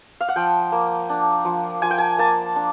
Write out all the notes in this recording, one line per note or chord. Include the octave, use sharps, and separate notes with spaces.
F5
F#5
F3 G5
A#3
D4
F3
F3 G#5
G5
G#5
A#3 A5
D4